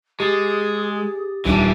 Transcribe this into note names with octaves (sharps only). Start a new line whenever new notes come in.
G#3 G4 G#4 D#6 A6
D#1 E3 G3 D4